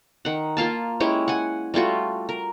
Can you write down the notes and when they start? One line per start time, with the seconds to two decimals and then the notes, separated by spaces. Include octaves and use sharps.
0.25 D#3 F#5
0.57 A#3 F4 F5 A5
1.00 G#3 C#4 E4 G4
1.28 F#5 G#5
1.74 G3 A3 F4 F#4
2.29 A#4